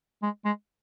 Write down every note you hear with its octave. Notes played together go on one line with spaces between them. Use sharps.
G#3
G#3